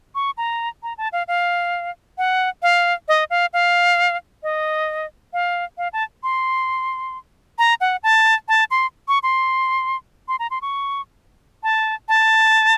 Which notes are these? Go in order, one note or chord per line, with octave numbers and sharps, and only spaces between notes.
C#6
A#5
A#5
A5
F5
F5
F#5
F5
D#5
F5
F5
D#5
F5
F5
A5
C6
A#5
F#5
A5
A5
C6
C#6
C6
C6
A#5
C6
C#6
A5
A5